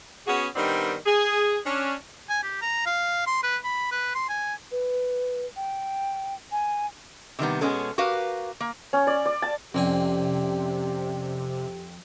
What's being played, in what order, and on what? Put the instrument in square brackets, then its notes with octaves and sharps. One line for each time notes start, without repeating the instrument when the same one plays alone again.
[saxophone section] B3 C#4 F#4 G#4
D#3 G3 B3 C4 D4 D#4
G#4
C#4 D4
[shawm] G#5
G4
A#5
F5
C6
B4
B5
B4
C6
G#5
[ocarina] B4
G5
G#5
[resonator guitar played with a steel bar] C3 D#3 G3 B3
B2 G#3 B3 C#4 G#4 A4
F#4 G4 A#4 B4 F5
A#3
[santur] C#4
D5
D5
A5
[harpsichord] F2 C4 G#5 [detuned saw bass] C3 [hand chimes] C#4 D5 [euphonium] G4